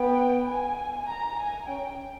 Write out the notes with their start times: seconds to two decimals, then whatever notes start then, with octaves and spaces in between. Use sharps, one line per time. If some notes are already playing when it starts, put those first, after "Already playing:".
Already playing: B3 G5
0.48 G#5
1.08 A#5
1.38 G#5
1.68 C#4 G5